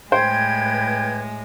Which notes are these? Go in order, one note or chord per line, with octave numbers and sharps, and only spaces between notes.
A2 G#3 B4 C5 G5 G#6